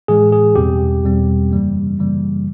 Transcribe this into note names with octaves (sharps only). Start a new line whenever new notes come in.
A2 E3 G#3 G#4
G#4
E2 B2 G3 C4 G4
E2 B2 G3 C4
F#2 C#3 E3 G3 A#3
F#2 C#3 E3 G3 A#3